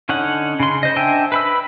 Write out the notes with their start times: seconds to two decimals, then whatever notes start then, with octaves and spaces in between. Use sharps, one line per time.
0.09 D3 C#4 D#4 C#5 F#5
0.60 C#3 C6
0.83 C5 D#5
0.96 D4 C5 E5 G5 G#5
1.32 B4 B5 E6